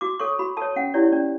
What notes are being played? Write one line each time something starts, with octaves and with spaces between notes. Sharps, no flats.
F#4 D6
A4 C#5 C#6
F#4 B5
A4 C#5 A5
C#4 F#5
E4 G4 C#5 D5
C#4 D5